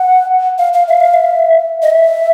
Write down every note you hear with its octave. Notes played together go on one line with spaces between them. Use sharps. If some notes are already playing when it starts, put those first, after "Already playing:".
Already playing: F#5
F5
F5
E5
F5
E5
D#5
E5